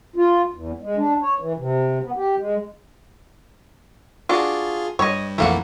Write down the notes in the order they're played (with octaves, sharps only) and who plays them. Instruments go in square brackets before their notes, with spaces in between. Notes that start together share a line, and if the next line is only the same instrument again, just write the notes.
[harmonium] F4
E2
G#3
D4
C#5
E3
C3
B3
G4
G#3
[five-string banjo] D4 F#4 [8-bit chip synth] F4 G#4
[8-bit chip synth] G2 [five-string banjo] C#5 D#5
[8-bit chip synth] A#1 F2 E3 [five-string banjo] A3 A#3 F#5